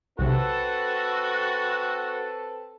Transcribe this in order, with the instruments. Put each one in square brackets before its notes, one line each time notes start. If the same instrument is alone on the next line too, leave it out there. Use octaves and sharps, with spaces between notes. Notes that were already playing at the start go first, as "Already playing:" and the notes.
[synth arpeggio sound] B1 C3 [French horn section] C4 A4 B4 [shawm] F#4